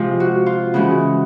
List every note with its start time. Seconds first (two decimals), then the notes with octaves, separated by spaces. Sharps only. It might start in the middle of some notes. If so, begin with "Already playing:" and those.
Already playing: C3 F3 G#3 C4 F4
0.20 F#4
0.46 F4
0.74 C#3 E3 G#3 C#4 F#4